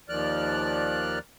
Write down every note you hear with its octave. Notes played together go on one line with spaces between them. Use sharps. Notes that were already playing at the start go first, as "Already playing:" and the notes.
D#2 D#3 F3 D5 F6 F#6